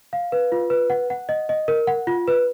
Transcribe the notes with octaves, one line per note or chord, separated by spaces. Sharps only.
F5
B4
F4
B4
F#5
F#5
D#5
D#5
A#4
F#5
F4
B4